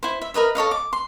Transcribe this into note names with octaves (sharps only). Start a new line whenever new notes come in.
E4 C5
E5
A#4 B4 D#5 E5
A4 C#5 D#5 F5
D6
C6